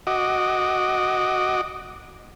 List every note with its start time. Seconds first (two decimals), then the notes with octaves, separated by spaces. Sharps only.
0.07 F#4 D#5 D6